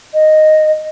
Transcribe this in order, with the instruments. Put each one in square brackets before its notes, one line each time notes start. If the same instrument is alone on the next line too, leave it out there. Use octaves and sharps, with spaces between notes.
[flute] D#5